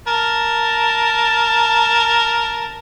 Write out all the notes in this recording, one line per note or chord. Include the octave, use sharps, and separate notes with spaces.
A#4 A5